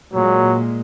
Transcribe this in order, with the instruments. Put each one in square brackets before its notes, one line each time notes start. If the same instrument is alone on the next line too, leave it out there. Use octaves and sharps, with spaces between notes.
[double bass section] A#2 G#3 [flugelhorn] F#3